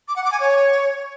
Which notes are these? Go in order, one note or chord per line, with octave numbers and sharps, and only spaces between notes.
D6
F#5
D6
G#5
C#5